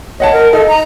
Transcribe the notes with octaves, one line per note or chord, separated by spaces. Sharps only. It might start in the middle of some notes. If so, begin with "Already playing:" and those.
C#5 D#5 F#5 A5
A#4
D#4 A4 D#5
A#5